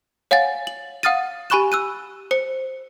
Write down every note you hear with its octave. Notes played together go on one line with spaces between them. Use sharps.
C#5 F5 F#5 G#5 A6
F#7
F5 F#5 D#6 F6 A6 D#7
G4 G#5 B5 C#6 F#6 E7
E6 F#6 D#7
C5 C#7